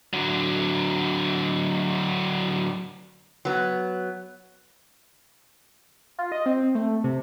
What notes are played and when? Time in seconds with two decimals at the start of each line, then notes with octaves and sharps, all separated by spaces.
0.13 D3 F#3
3.45 F#3 B3
6.18 F4
6.32 D#5
6.46 C4
6.75 A3
7.04 C3